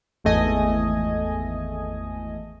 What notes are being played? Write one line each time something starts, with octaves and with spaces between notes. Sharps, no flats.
G#1 E2 A3 D#5 G#5